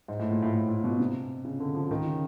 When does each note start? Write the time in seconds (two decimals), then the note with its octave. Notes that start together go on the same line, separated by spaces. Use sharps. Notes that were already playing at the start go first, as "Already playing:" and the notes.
0.08 G#2
0.20 A2
0.31 A#2
0.43 A2
0.54 A2
0.68 A#2
0.84 B2
1.00 C3
1.45 C#3
1.60 D3
1.75 F3
1.91 D#3
2.06 C#3